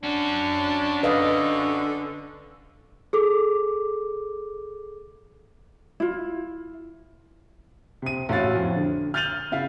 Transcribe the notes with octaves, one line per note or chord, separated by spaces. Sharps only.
C#4 D4 F#4
D3 B4 D#5 F5
G#4 A4 D6
E4 F4
C3 D#7
A1 E4 F#4 C#5 F5 A6
F2
D3
F6 G6 A6 D#7 F7 F#7
C#3 E4 F5